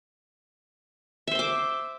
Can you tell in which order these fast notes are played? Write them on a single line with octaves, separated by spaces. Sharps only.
E5 C5 C6 D6